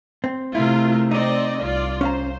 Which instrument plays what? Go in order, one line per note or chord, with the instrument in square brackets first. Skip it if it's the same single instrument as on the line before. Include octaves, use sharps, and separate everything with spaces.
[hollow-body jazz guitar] C4
[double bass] C3 A3 [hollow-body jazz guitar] E4 [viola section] F4 A#4
[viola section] C4 D5 D#5 [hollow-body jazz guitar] D#4
[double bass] C2 [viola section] F4 D5
[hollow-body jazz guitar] C#4 F5 A#5 [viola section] C5